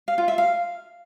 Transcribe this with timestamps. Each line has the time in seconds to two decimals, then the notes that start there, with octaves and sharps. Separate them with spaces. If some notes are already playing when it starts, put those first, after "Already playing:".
0.08 F5
0.18 F4
0.28 E5
0.38 F5